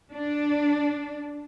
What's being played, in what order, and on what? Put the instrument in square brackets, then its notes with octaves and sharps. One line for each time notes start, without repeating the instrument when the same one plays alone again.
[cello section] D4